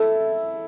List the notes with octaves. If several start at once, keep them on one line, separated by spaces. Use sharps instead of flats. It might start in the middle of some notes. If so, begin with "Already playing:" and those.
Already playing: E4 A4